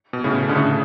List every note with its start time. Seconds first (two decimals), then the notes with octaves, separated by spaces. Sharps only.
0.13 B2
0.24 A2 C#3
0.49 D3
0.56 A2 C#3